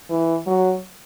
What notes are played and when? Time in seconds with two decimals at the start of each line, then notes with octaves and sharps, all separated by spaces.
0.10 E3
0.47 F#3